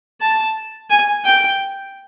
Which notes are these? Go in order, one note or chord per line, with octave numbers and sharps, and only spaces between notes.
A5
G#5
G5